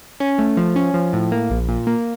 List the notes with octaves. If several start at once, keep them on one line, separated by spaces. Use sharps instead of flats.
C#4
A3
F3
C#4
F3
A2
A#3
A#1
A#2
A#3